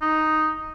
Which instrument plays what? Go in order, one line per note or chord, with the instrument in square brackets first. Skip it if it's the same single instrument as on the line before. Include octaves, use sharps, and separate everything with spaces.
[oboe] D#4